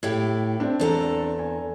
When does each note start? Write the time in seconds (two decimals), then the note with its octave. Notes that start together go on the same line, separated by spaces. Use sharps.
0.03 A2 E4 G4
0.60 C4 D4
0.80 E2 A4 A#5
1.39 G#5